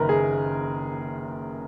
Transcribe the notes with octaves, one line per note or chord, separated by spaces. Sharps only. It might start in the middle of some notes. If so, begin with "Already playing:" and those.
Already playing: F#1 F#2 D#3 A#4 B4
G#4